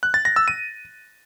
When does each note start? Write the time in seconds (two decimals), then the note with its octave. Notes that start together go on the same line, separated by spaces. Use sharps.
0.03 F#6
0.14 A6
0.25 A#6
0.36 E6
0.48 D#7